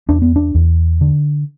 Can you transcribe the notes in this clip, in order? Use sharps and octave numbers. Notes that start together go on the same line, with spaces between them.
E2 D4
B3
D4
E2
D3